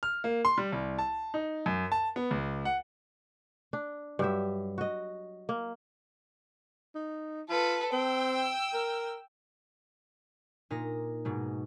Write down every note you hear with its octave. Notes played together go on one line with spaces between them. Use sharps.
F6
A#3
C6
G3
C2
A5
D#4
F#2
A5
B3
C#2
F#5
D4
G2 F#3 G4 E5
F#4 D#5
A#3
D#4
F4 A4 B4
C4 G5 E6
A#4
A#2 D#4 A#6
G#2 B2 G#3